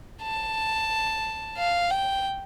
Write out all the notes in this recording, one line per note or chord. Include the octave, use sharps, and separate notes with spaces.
A5
F5
G5